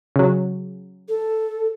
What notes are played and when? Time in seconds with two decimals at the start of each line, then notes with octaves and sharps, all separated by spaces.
0.16 C#3 F#3
1.09 A4